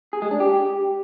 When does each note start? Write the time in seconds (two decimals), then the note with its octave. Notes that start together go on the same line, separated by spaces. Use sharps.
0.13 G#4
0.22 G#3
0.31 D4
0.40 G4